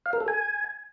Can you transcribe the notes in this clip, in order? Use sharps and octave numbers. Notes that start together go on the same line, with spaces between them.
F5
A#4
A4
G#5